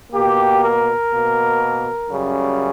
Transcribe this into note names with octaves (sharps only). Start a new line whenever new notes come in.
B2 A#3 G4
A#4
B2 A#3
F#2 C#3 G3